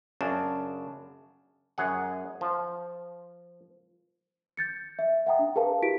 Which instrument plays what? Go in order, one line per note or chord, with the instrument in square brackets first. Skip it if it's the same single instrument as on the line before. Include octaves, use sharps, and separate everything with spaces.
[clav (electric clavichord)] F#2 C#3 D4 [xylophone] A5
[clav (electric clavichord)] F#2 G#4 F#5
F3
[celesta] G6 A6 C#7
E5
E5 F#5 G5 A#5 D#6
D4
G#4 A#4 B4 F5 A5 A#5
E4 F#4 G4 B6 D7